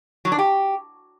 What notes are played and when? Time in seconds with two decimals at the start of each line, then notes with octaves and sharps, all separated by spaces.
0.25 F#3
0.32 D4
0.39 G4